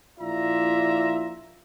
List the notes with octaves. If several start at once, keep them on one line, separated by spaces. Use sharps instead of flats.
A#1 E4 F4 D5 E5 A#5